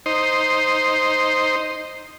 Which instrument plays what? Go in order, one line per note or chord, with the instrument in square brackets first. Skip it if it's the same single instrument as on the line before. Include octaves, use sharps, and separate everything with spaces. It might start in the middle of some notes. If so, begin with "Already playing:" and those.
[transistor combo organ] D#4 C5